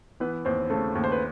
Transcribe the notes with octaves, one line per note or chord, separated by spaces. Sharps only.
E3 B3 B4
D#2 C4 C5
C#3 A3 A4
D#2
C5
B4